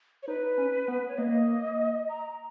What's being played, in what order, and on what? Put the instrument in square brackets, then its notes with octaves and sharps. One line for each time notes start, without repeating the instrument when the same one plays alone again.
[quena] C#5
[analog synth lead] D#4 [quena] B4
[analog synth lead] C#4
B3
[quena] C#5
[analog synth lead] A#3 [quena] D#5
[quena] A#5